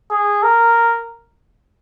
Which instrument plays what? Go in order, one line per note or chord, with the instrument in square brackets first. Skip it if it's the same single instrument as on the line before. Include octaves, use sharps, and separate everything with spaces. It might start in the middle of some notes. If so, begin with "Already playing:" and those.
[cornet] G#4
A#4